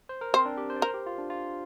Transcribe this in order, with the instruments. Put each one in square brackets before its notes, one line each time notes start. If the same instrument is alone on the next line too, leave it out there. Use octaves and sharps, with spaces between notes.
[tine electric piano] C5
A#4
[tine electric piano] C4 [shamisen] C5
[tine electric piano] D4
G4
C5
D5
[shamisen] A#4 [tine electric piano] C5
[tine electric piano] G4
F4
D4
F4